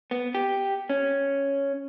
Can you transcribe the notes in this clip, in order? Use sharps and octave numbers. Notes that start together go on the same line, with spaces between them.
B3
G4
C#4